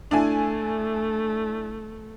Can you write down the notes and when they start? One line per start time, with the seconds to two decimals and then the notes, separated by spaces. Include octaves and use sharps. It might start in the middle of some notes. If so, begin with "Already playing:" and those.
0.11 A3 D4 E4 G#5